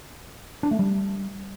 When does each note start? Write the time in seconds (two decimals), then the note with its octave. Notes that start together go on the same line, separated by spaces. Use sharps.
0.63 D4
0.71 A3
0.79 G3